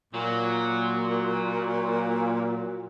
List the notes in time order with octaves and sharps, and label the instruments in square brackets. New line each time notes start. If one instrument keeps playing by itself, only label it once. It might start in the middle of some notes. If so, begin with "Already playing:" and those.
[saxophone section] A#2 [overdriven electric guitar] F#3